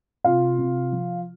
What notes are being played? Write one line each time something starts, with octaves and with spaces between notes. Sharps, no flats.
C3 F4 F5
C3
F3